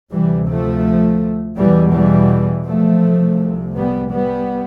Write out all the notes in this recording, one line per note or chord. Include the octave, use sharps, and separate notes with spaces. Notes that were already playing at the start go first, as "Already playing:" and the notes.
D2 C3 E3 G3
F3 A3
E2 B2 E3 G3
E3 G3
F3 A3
C2 C3
G3 B3
G3 B3